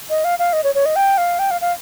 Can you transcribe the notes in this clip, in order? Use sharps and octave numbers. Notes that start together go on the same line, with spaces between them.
D#5
F5
F5
D#5
C#5
C#5
D#5
G5
F5
G5
F5
F5